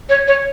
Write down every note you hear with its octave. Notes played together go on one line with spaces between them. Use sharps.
C#5
C#5